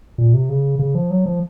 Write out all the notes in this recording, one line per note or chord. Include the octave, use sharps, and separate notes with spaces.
A#2
C3
C#3
C#3
F3
F#3
F3